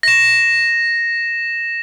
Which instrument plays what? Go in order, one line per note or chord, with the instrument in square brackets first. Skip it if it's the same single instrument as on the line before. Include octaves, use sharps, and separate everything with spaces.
[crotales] A#6 E7